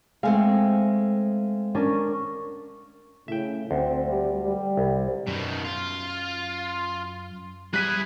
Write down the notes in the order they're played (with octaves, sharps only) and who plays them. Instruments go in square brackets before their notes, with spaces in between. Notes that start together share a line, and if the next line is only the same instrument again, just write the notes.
[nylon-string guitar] G#3 A3 C4 [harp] F5 G#5
[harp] C#4 D4 A#4
[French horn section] A2 C#3 [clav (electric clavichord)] E5 G5
[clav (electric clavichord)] D2 [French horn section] C4
[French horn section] G3
G3
[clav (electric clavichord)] C2
[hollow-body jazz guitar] F#2 [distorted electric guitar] B2 D#3
[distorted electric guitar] F4
[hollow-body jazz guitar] G3 [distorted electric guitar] E4 G#4 [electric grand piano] F#6 B6 D#7